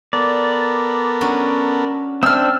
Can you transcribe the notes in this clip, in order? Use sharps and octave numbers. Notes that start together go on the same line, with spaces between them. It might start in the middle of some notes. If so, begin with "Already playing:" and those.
B3 A4 A#4 D5
F#3 C#4 D4
C4 D4 E5 E6 F6